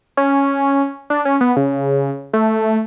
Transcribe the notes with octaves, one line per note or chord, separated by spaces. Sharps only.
C#4
D4
C#4
B3
C#3
A3